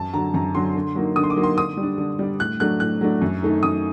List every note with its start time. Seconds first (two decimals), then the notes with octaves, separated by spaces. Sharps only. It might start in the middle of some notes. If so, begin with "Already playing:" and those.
Already playing: F#2 A5
0.13 D3 F#3 A#5
0.34 F#2 A#5
0.55 D3 F#3 C6
0.75 D3
0.96 F#3 A#3 D#4
1.16 D3 D#6
1.23 C6
1.30 D6
1.37 F#3 A#3 D#4
1.44 C6
1.57 D3 D#6
1.77 G3
1.83 D4
1.98 D3
2.19 G3 D4
2.39 A2 F#6
2.60 F#3 A3 D4 F#6
2.80 A2 F#6
3.01 F#3 A3 D4
3.22 F#2
3.42 D#3 A3 D#4
3.63 F#2 D#6